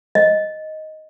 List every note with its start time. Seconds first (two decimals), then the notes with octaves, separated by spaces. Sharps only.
0.15 D#5